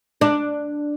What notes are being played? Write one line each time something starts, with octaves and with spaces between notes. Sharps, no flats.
D4